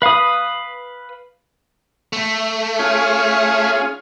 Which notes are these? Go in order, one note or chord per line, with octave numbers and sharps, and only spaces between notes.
B4 F5 B5 D#6
A3
C#4 F4 G#4